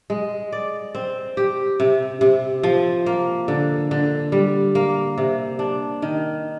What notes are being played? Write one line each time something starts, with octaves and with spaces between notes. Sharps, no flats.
G#3
D5
C4
G4
C3
C3
F3
A#3
D3
D3
G3
A#3
C3
D4
D#3